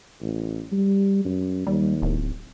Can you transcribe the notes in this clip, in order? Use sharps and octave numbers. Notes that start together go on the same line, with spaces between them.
A1
G3
F#2
D#2 G3
D1